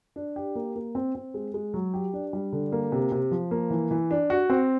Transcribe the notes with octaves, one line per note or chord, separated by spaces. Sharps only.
D4
G4
A#3
A#3
C4
C4
G#3
G#3
F#3
G4
D4
G3
D3
A#3
C3
C3
F3
A#3
E3
E3
D4
F#4
C4